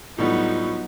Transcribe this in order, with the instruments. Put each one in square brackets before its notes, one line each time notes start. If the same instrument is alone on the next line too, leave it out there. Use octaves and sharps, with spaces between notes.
[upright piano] A2 G3 [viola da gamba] F#3 B3 D#4 [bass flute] F4